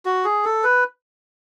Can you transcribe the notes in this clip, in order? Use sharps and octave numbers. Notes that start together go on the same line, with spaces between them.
F#4
G#4
A4
B4